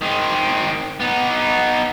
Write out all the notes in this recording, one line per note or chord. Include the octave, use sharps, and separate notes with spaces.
D#3 C4
B3 D#4